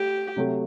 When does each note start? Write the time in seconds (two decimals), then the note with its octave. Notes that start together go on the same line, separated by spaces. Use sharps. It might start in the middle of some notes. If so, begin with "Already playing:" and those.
Already playing: A3 G4
0.36 C3 F#3 A3